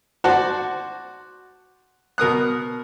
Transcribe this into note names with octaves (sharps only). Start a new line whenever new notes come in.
F#4 C5 D5 F#5 A5
B2 A#4 D#6 F#6